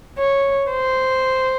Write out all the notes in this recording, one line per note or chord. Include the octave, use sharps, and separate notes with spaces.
C#5
C5